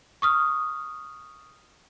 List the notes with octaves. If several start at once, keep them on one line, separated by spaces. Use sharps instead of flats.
C#6 D#6 F6